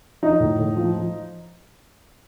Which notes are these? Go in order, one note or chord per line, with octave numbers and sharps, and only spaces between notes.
F3 D#4
A2
A2
F3
F3